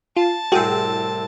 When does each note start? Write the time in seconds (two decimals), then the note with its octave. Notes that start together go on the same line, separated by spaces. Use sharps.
0.17 F4 A5
0.52 C2 A2 C4 F#4 G#4 G5